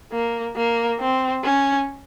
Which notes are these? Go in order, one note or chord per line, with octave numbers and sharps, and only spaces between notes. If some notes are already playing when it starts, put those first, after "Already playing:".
A#3
A#3
C4
C#4